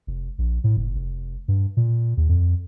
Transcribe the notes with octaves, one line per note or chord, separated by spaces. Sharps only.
F1
A#1
A2
F#1
F1
G2
A#2
D#2
F2